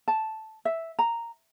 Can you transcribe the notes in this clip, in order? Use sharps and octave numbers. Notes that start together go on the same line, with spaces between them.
A5
E5
A#5